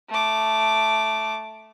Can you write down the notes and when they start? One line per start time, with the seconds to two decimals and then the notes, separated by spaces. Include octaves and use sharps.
0.10 A3 D6